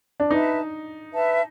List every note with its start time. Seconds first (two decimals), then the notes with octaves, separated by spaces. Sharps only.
0.20 D4
0.30 D#4 B4 E5 A5
1.12 B4 E5 A5